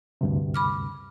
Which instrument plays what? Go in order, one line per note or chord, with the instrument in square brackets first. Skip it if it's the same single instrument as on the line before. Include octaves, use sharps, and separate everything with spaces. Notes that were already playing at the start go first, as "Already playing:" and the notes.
[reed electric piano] D2 G2 C3
[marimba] B5 D6 F6